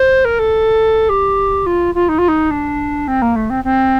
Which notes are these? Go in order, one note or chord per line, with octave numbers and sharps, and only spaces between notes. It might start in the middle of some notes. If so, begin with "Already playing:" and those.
Already playing: C5
A#4
A4
G4
F4
F4
D#4
F4
D#4
D4
C4
A#3
A3
C4
C4